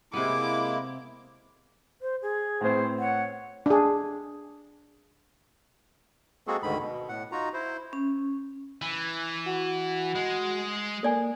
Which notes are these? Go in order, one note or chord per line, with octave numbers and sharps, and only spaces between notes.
C3 G#3 A#3 B3 E4 D6
C5
G#4
A2 B3 C4 C5
C#5 F#5
D4 G#4
G#3 A#3 C4 F#4 G#4 A4
D2 G#2 D3 D#3 B5
B2
A2 F#5
D#4 F4 F#4 A#5
E4 C5
C#4
E3
F#4
G#3
A#3 A4 D5 G#5